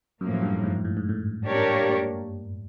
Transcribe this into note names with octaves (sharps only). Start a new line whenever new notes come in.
F#2 A2 F3 A#3
F#2
G2
G#2
A2
G#2
A2
A#3 D4 G4 A#4 C#5